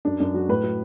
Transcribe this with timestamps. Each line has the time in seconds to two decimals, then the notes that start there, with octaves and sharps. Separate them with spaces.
0.05 F#2 D4
0.20 F#2 D4
0.34 F#3 F#4
0.49 A2 B4
0.64 F#3